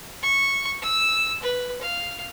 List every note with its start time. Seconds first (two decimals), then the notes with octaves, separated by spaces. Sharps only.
0.23 C#6
0.82 E6
1.43 B4
1.82 F5